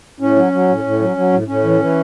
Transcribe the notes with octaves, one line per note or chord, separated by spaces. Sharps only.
A2 C#4
F#3
F#3
A2
A2
F#3
F#3
A2
A2 C#4
E3
E3